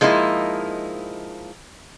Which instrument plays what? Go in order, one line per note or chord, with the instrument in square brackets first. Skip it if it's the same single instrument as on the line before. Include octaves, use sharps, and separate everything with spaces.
[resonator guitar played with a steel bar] F3 G#3 A#3 D#4 E4